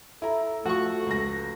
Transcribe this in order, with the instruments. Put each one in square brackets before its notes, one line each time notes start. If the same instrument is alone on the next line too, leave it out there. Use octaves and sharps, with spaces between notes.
[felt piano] E4 A#5 [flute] A4
[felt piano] F3 [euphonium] A3 [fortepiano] F#4 C#6
[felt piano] C#2 A#6